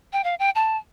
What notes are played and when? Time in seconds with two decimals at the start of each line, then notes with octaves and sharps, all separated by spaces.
0.13 G5
0.24 F5
0.39 G5
0.55 A5